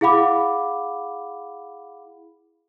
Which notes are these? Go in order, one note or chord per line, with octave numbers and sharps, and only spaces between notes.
E4 G#4 F5 F#5 B5 D6